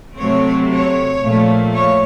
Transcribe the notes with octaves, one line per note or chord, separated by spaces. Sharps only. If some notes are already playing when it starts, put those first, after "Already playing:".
C3 F#3 A3 C4 C#5
C#5
A#2 F3 A3
C#5